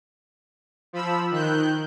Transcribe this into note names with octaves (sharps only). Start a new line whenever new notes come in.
F3 B5 E6
D#3 F#6 G6